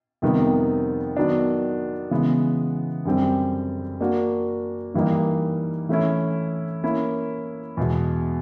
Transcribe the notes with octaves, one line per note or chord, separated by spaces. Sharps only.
F2 C3 D#3 G3 B3
D#3 F#3 B3 D4
C#3 E3 G#3 B3
F#2 D3 G3 C4
A#3 D4 F#4
G2 E3 G3 A#3 D#4
E3 A3 C#4 E4
A#3 C#4 E4
E2 B2 G#3